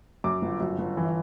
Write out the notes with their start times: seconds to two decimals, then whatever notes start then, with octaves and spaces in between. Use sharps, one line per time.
0.24 F#2 D6
0.42 G1
0.60 F#2
0.78 G1
0.97 E3